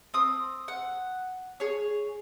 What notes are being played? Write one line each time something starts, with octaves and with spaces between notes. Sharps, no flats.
C4 D#6
F#5
G#4 C#5